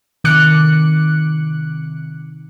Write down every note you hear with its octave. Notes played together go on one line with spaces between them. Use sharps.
C3 D#3 D6 F#6 C#7